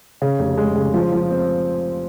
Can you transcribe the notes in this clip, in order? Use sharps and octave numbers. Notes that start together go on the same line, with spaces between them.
C#3
F1
G#3
C#3
F3
F3
C4